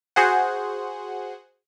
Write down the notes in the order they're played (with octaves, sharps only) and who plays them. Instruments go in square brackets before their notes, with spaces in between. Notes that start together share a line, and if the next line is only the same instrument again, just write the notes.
[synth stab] F#4 G#4 C5 F#5